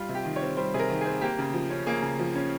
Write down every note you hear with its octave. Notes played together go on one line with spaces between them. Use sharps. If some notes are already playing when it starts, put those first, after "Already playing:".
Already playing: G3 F4
C3
G4
D#3
C#5
C4
G3 C5
C3 G#4
A#4
D#3
C4 G#4
A#3 G4
C#3
F3
C#4
A#3 G#4
C#3
F3
C#4